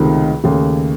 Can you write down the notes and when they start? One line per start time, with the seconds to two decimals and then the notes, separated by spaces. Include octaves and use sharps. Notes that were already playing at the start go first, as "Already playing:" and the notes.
Already playing: C#2 C3 D#3 A3
0.44 D#2 C#3 A3